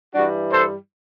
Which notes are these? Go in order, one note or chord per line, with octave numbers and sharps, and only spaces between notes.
G2 E3 G3 D4 F#4
A4 C5